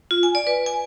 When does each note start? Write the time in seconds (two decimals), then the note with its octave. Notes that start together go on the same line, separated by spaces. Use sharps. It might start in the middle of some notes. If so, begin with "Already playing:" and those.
0.11 F4
0.23 G#5
0.35 D5
0.47 B4
0.66 G#5